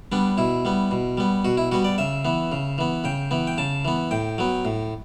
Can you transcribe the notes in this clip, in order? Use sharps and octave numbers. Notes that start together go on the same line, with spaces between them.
G3 B3 D4
B2 E4
G3 B3
B2
G3 B3
B2 F#4
E4
G3 B3 F#4
D5
C#3 E5
E3 B3
C#3
E3 B3
C#3 G5
E3 B3
G5
C#3 A5
E3 B3
A2 G5
F#3 B3
A2